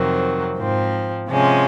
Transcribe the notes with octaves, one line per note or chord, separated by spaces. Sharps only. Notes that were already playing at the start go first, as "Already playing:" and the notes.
Already playing: F2 C3 D#3 F#3 C4
G#2 F3 C4
C3 F3 G#3 C#4